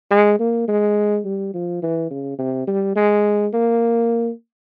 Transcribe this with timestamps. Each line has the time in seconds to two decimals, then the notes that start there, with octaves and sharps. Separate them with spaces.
0.11 G#3
0.40 A#3
0.68 G#3
1.25 G3
1.54 F3
1.83 E3
2.11 C#3
2.39 C3
2.68 G3
2.96 G#3
3.53 A#3